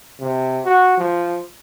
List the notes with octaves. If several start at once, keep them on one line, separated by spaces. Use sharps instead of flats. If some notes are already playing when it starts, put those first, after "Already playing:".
C3
F#4
F3